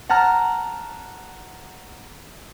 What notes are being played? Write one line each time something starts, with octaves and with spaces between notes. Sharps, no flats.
F#5 A5 A#5 F6